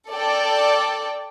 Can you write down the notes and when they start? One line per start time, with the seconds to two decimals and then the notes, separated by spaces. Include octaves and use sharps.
0.10 A4 D5 G5